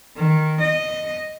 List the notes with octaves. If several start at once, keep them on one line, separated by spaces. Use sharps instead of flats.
D#3
D#5